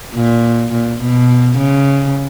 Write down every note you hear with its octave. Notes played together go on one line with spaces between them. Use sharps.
A#2
A#2
B2
C#3